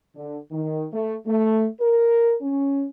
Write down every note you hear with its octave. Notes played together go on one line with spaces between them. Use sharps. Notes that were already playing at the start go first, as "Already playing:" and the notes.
D3
D#3
A3
A3
A#4
C#4